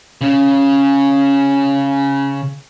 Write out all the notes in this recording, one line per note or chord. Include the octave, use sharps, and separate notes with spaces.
C#3 C#4